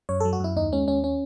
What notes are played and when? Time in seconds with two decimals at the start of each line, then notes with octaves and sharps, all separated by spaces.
0.09 F#2 C#5
0.20 A4
0.25 F#3
0.33 F#4
0.40 F#2 E4
0.56 D#2 D#4
0.72 G#3 C#4
0.88 D#2 C#4
1.04 C#4